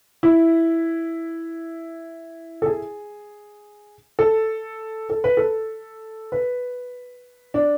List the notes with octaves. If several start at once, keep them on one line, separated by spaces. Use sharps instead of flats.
E4
A4
G#4
A4
A4
B4
A4
B4
D4